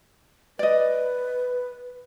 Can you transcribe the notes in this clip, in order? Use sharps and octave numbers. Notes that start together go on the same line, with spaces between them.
B4 D5 D#5